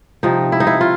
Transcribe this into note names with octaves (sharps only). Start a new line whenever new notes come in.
C3 F3 D#4
E4
D#4
E4
F4